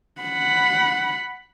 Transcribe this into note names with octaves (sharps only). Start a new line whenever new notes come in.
F#5 B5